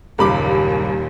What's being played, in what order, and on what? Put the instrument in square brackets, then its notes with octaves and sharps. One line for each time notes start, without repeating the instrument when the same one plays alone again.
[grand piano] F#1 B5 D6 [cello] D#2 A#2 [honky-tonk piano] G3 A#4